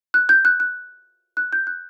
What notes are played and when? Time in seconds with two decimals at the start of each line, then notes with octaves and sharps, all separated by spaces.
0.14 F#6
0.29 G6
0.45 F#6
0.60 F#6
1.37 F#6
1.53 G6
1.67 F#6